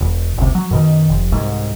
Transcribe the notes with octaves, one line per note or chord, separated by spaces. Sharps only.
E1
F#1 C#2 C3
F#3
F#2 B2 D#3
F1
C2 G#2